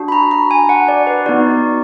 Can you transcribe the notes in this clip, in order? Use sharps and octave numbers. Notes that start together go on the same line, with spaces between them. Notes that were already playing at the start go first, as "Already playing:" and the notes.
Already playing: D4 F#4
B5
A#5
A#5
G#5
F#5
D5
B4
B3 D#4 F#4 D5